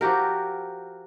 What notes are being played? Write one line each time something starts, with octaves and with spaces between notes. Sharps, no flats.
F3 F#4 G4 A#4